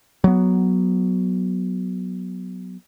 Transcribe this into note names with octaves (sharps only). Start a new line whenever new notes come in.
F#3 B3